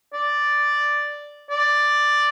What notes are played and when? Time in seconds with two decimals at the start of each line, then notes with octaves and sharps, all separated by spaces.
0.13 D5
1.51 D5